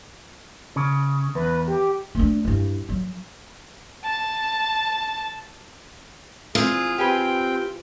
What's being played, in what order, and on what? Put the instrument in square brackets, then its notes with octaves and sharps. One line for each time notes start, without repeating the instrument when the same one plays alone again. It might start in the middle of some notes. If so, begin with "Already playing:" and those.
[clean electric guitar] C#3
[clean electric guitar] E2 [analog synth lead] B4
[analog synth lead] G4
[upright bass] A3 D4
G2 E4
F#3
[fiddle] A5
[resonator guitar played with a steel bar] E3 C4 [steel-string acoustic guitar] F4 [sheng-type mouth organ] G#4
[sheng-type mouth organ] C4 G5 [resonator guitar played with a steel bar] G4 G#4 B4